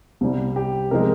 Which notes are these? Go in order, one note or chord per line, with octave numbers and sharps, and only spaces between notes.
C2 C3 G3
G4
C3 F3 G#3 A#4